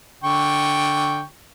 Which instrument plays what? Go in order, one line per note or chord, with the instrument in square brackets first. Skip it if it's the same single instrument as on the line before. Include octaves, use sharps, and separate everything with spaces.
[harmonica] D3 G5 C#6